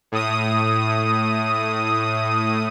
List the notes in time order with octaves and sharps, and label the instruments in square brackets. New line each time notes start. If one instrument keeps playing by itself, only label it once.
[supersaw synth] A2 D#6